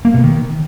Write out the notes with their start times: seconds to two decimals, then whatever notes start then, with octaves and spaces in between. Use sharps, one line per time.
0.05 A#3
0.14 B2
0.23 D#3